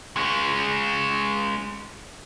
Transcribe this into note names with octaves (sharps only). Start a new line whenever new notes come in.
G#3 C#4